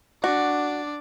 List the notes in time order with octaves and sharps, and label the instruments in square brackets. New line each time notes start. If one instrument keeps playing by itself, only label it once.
[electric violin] D4 D5 [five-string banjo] F#4